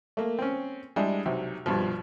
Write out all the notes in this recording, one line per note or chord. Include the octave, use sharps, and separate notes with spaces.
A3 A#3
C4 C#4
G3 G#3 D4 E4 G#4
B1 C3
C2 G2 B2 F3